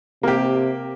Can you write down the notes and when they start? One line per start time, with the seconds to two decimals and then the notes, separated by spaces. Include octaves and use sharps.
0.23 C3 A#3 G4